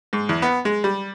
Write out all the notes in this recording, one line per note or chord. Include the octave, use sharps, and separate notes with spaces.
G#2
E2
B3
G#3
G3